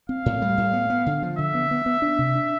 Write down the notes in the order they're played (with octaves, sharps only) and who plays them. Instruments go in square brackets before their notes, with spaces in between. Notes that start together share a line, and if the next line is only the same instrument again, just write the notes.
[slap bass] C4 [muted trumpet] F5
[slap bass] A2
G3
A2
B3
B3
D3
F3
[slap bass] D3 [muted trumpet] E5
[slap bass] B3
B3
B3
D4
C3
D4